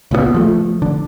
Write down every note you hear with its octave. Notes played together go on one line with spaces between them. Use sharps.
C#2 A#2 F3 B3
F3 G3 A3
D3